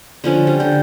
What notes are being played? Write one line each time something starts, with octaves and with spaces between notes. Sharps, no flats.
D3 F3 C#4
G3
D3 G5